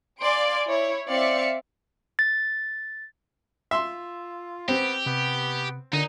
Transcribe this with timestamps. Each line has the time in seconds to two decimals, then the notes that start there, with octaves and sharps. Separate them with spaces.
0.21 D5 F5 G#5 C6 D7
0.69 E4 C#5
1.10 C4 D5 E5 F5 C#7
2.19 A6
3.71 F4 E5 C6
4.68 B3 C4 G4
5.06 C3 B3
5.93 A#2 D3 D#4